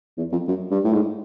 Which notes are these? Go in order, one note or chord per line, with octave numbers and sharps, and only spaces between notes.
E2
F2
F#2
G2
A2
G#2